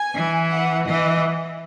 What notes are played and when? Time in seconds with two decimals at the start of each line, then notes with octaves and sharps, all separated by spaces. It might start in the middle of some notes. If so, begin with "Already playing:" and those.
Already playing: G#5
0.15 E3
0.51 F#5
0.88 E3 D#5